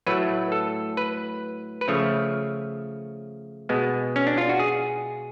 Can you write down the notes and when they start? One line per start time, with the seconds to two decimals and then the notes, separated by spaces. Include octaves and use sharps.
0.07 A2 F#3 A3 B4
0.52 A4
0.97 B4
1.81 B4
1.88 C#3 F3 A3 C#5
3.69 B2 G#3 B3
4.16 C#4
4.27 D4
4.38 F4
4.49 F#4
4.59 G#4